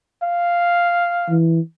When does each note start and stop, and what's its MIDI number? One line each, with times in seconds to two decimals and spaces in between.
0.23 1.33 77
1.30 1.60 52